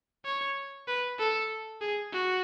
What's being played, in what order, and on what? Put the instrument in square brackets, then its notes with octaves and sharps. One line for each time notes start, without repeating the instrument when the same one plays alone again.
[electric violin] C#5
B4
A4
G#4
F#4